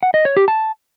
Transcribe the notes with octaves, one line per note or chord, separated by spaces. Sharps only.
F#5
D#5
C#5
G4
A5